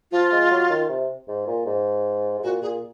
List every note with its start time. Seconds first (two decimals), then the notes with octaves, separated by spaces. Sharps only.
0.12 F3 F4
0.32 G#3
0.51 F#3
0.69 D#3
0.89 C3
1.28 G#2
1.47 A#2
1.66 G#2
2.39 G#2
2.44 A#2 F#4
2.62 A#2 G#4